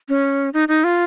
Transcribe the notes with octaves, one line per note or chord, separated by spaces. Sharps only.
C#4
D#4
D#4
F4